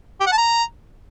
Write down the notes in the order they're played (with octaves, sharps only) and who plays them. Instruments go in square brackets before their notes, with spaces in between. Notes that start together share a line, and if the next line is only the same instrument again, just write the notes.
[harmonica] G4
F#5
A5
A#5